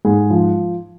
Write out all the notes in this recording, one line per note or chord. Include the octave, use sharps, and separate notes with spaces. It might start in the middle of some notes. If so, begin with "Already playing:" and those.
G#2 G#4
F3